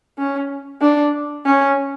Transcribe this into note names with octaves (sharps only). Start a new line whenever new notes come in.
C#4
D4
C#4